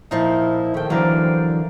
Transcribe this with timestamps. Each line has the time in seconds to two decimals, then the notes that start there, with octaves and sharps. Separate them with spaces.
0.11 A#2 F3 D#4 E4
0.74 G#2 D#3 A3 G5
0.90 D3 E3 F#3 A#3 A#4 C5 D5